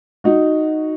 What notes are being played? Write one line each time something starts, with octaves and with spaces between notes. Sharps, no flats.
D#4 F#4